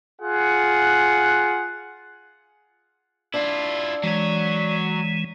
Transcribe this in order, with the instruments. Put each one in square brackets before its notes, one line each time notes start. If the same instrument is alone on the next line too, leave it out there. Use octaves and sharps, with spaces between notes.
[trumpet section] F4 G#4 F#5
[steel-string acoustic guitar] D4 [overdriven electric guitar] E4 F4
[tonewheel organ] E3 G#3 [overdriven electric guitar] F#3 C#5